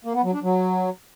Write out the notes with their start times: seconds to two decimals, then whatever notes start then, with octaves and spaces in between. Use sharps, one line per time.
0.05 A#3
0.14 B3
0.24 F#3
0.33 D4
0.43 F#3